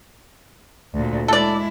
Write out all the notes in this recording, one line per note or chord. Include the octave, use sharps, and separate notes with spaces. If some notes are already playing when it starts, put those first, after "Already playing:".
D2 A#2
G#3 E4 A4 D5